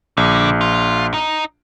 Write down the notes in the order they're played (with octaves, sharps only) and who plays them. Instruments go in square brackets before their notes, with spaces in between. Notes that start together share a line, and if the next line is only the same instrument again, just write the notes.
[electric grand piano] A#1 [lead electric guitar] D3
[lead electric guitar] F4
D#4